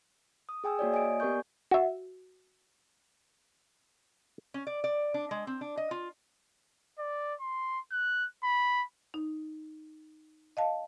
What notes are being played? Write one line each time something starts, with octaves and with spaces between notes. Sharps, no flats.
D#6
G#4 G5 G#5 D#6 E6
A#3 F#4 C#5 D5
D#5 G#5 D#6 D7
G#5
B3 G4 A#4 D5 C#6 G6
F#4 E5
C#4
D5
D5
D4
G#3
C4
D4
D#5
F4
D5
C6
F#6
B5
D#4
D#5 F5 A5